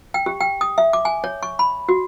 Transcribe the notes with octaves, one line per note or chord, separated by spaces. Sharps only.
G5
G4
G5
D#6
E5
D6
G#5
C#5
C#6
B5
F#4